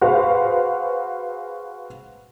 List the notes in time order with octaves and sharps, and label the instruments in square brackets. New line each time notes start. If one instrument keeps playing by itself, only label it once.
[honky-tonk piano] F#4 G#4 B4 C5 F5